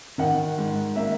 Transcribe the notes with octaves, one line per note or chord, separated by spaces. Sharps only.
D#3 F#5
G#2
A#3 E5